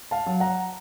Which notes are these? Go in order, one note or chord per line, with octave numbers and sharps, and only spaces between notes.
F5 A5
F#3
F#5 A#5